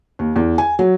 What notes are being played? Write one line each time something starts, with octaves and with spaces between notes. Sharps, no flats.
D#2
E2
G#5
F#3